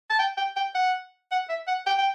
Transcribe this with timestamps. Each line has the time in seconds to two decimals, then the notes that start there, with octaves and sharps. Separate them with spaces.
0.10 A5
0.19 G5
0.37 G5
0.56 G5
0.75 F#5
1.31 F#5
1.49 E5
1.68 F#5
1.86 G5
1.98 G5